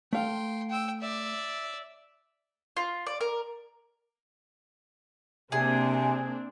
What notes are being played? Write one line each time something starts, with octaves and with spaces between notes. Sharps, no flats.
A3 F5 G5 C6
G5 E6
D5 E5
F4
D5
A#4
C3 A#3 C4 D4 G#4 G#5